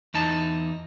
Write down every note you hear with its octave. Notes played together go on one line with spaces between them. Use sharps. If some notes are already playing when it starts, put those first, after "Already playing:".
E2 D#4 A5